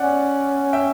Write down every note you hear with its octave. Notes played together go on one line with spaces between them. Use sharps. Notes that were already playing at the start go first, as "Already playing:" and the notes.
Already playing: C#4 D5 F#5
E5 G5